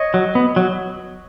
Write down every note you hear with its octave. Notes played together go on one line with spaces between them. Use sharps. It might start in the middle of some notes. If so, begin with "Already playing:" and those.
Already playing: C#5 D#5
F#3
B3
F#3